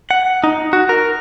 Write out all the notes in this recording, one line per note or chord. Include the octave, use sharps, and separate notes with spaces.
F#5
D#4
F#4
A#4